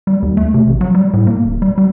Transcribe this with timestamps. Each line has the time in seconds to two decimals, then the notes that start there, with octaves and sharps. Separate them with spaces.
0.07 G3
0.22 D#2
0.37 A3
0.54 C3
0.67 A1
0.81 F#3
0.95 G3
1.13 A2
1.27 A#3
1.44 D#1
1.62 G3
1.78 G3